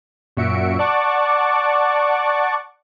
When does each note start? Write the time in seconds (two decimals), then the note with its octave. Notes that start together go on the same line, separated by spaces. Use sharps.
0.37 F#2 A#2 F#4 E5 C#7 D7
0.79 D5 F#5 A5 C#6 D6